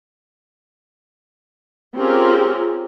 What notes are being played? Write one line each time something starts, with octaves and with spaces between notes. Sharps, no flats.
C4 C#4 F4 G4 G#4 A#4